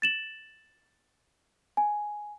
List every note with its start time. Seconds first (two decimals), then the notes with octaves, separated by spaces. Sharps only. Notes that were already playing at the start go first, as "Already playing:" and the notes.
0.02 A6 E7 F#7
1.77 G#5